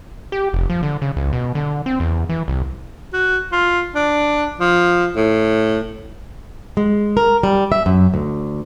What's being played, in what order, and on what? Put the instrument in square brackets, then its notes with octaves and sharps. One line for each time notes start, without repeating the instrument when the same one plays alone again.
[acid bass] G4
F1
F3
D3
C#3
C#2
B2
D3
C4
E2
E3
C2
[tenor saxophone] F#4
F4
D4
F3
A2
[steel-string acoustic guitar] G#3
A#4
G3
E5
F#2
D2